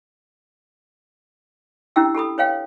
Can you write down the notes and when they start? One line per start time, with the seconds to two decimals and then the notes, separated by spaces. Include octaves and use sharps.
1.96 C#4 D4 E4 G4 G5 E6
2.15 G4 A4 B5 D#6
2.38 B4 C#5 F5 G5